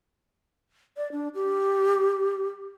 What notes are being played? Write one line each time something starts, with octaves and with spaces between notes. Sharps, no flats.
D5
D4
G4